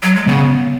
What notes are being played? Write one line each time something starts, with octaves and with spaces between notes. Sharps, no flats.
F#3
G#3
C#3 B3